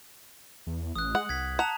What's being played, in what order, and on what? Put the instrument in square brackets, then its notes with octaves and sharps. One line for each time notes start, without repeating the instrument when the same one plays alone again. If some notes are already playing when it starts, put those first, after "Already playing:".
[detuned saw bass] E2
[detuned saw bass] A1 [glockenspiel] D#6 F#6
[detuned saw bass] G#3 [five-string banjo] F#5 [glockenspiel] F#7
[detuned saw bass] C2 [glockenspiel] G#6 B6
[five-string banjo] F#5 [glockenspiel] A5 A#5 F7